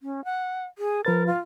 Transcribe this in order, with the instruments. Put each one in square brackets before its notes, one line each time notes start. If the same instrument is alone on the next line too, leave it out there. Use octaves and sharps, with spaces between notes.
[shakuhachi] C#4
F#5
G#4
[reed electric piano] F3 B4 A6 [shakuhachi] A#4
[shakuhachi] F4